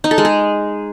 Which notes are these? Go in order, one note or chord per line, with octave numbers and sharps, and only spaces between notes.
D#4
A4
G#3
G#4